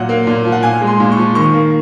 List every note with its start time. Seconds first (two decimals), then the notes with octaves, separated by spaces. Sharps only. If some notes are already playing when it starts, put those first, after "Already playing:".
Already playing: A#2 F#3 F#5
0.09 A#3
0.27 A#2
0.45 F3
0.52 F#5
0.63 A#2 G#5
0.81 G#3
0.87 C6
1.00 A#2
1.12 C#6
1.17 F3
1.35 D#3 C#6
1.54 A#3